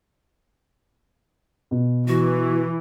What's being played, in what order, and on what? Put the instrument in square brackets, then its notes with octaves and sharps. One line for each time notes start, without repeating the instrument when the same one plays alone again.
[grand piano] B2
[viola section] E3 [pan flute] F#4